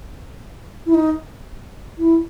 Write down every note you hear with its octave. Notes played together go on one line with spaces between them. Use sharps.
E4
D#4
E4